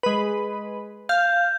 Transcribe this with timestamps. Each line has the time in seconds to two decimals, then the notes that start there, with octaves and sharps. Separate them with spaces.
0.03 G#3 B4
1.09 F5 G6